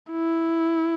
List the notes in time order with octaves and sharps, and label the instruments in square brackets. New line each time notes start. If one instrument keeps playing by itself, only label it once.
[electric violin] E4